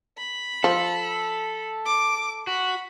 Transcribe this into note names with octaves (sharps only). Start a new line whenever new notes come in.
B5
F3 A4
D6
F#4 B5